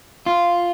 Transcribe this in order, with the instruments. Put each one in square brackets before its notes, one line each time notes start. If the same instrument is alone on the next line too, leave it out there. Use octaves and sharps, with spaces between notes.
[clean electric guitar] F4